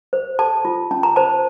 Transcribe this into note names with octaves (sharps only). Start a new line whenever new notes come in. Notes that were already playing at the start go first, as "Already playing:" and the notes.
C5
A4 A5
F4
C#4 A5
A#5
C5 A5